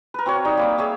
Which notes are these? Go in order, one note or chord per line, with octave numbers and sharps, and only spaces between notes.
A#4 B4
C4 F#4 C#5
G3 D#4
A#3 B5 D6
G#4 C#5 E5